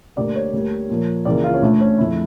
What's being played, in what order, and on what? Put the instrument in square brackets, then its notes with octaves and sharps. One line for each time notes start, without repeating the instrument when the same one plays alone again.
[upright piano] D2 D3 G3 A#3 D5
C#5
D2 D3 G3 A#3
A#2 F3 A#3
C#2 C#3 E3 A#3 D5
F4
C#4
D2 D3 A3 D4
C#4
F2 D3 F3 A3 E4